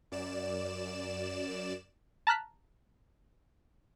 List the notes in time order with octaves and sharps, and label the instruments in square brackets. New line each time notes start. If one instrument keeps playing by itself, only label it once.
[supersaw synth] F#2 D5 E7
[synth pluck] A5 A#5 F6 F#6 B6